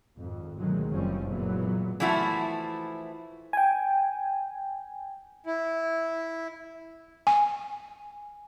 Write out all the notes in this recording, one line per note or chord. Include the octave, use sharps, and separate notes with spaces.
G#1 F2
D2 B2 D#3 F#3 G#3
F#1 F#2 F3 G3 C4 C#4
A#2 E3 F#3 G#3 B3
E3 F3 A3 E4 F#4
G5 G#5
E4
G#5